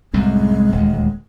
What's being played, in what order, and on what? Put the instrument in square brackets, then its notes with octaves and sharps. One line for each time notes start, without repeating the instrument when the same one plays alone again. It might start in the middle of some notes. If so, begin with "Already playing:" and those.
[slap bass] C2 F#2 A2 [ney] G#3
[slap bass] D#1 D2